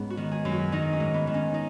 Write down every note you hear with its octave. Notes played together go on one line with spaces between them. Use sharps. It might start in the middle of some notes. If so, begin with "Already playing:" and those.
Already playing: G#2 B3 C#4
F#4
D#3
G#4
F#2
F#4
D#3 D#4
C#4
G#2
B3
D#3
C#4
D#4